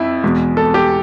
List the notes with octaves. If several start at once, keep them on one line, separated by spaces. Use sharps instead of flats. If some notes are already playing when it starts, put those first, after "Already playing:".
Already playing: F2 E4
E2 B2 G#3
A4
G4